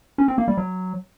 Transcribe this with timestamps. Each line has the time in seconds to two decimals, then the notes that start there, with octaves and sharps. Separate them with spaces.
0.18 C#4
0.28 C4
0.38 A#3
0.48 G3
0.58 F#3